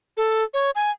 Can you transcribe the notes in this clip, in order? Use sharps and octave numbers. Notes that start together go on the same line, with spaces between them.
A4
C#5
G#5